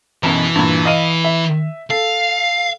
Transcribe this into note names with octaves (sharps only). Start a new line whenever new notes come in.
B1 F#2 B2 E3
G2 A#2
D#5 F5 D#7
E5
A4 F5